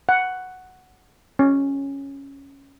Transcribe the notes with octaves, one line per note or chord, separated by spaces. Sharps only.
F#5
C#4